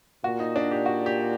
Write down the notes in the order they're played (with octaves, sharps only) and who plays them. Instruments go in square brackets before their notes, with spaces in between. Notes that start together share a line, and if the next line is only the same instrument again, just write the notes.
[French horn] A#2 [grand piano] F#4
[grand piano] D#4
D4
G4
F#4
G4